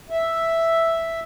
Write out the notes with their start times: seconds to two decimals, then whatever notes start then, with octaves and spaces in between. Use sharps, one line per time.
0.10 E5